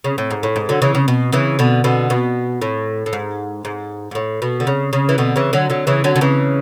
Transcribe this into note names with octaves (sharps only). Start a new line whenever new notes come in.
C#3
A2
G#2
A2
G#2
D3 F#3
C#3 E3
C#3
B2
C#3 E3
B2 D3
B2 D3
B2
A2
A2
G#2
G#2
G#2
A2
B2
D3
C#3
C#3
E3
B2 D3
C#3 E3
D3 F#3
D3 F#3
C#3 E3
D3 F#3
D3
C#3 E3